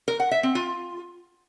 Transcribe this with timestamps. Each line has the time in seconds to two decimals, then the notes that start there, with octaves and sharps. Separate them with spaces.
0.08 A#4
0.20 F#5
0.31 E5
0.43 C4
0.55 F4